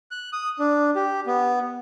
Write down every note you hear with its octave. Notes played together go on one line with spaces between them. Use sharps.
F#6
D#6
D4
G4
B3